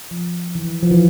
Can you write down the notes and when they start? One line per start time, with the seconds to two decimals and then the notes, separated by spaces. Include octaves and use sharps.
0.11 F3
0.55 E3
0.83 F3
0.91 E3